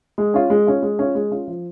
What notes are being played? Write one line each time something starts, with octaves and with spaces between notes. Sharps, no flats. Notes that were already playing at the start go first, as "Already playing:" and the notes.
G#3
C#4 F4
G#3
C#4 F4
G#3
C#4 F4
G#3
C#4 F4
F3